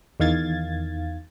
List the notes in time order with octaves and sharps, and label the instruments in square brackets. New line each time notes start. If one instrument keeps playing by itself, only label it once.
[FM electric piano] E2 D#3 F5 G#6 A6